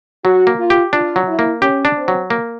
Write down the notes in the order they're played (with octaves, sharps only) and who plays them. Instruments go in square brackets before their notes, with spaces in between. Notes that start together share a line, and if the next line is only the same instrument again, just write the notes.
[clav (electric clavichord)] F#3 [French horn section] F#4
[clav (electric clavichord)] A#3
[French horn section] F4
[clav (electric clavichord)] G4
[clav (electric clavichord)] D4 [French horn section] F4
[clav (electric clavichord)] F#3
[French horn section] E4
[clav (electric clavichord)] A#3
[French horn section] C#4 [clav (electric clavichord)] G4
[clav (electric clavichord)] D4
[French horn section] C4
[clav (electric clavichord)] F#3
A#3